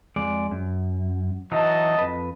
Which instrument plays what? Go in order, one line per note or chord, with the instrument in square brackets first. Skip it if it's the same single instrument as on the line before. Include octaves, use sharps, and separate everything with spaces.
[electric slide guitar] F2 G#3 D5
F#2
[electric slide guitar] E3 F#3 D#4 [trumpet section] D#5 A5
[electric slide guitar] F2 B4